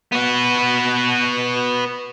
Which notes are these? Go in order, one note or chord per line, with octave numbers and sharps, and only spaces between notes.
B3 F#4